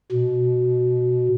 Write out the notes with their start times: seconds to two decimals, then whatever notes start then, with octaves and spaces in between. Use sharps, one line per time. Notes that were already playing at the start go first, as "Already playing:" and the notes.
0.12 B2